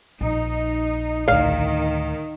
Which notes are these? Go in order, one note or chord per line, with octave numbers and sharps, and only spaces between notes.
A#1 D#4
D2 A2 D#3 F5